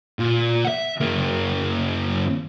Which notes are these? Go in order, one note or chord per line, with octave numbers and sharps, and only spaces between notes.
A#2
E5 F#5
F#2 A#3